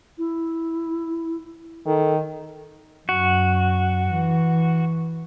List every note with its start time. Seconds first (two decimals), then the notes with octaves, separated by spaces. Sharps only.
0.18 E4
1.86 D#3 A4
3.09 F#2 F#4
4.10 E3